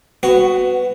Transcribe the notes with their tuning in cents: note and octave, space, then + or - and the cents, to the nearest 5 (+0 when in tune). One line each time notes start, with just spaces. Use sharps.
B3 +20 F#4 +0